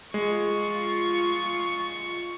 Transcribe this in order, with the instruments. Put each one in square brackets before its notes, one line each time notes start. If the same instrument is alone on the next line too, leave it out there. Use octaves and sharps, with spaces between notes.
[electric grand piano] G#3 [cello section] F4 [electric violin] C#6